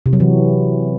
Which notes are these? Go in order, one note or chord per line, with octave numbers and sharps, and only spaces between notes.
C3
F#3
E3